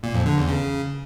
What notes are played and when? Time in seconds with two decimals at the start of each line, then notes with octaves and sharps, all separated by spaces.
0.03 A#2
0.14 F2
0.26 D3
0.37 E2
0.48 C#3